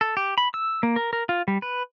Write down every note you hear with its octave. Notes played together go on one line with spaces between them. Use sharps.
A4
G4
B5
E6
A#3
A#4
A#4
F4
G3
B4